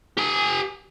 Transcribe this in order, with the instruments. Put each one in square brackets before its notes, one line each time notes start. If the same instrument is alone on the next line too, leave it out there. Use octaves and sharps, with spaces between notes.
[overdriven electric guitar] G4 G#5